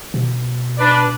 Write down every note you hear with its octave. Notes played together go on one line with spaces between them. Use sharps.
B2
D4 B4 D5